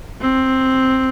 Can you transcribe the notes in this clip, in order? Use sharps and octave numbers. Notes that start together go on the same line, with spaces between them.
C4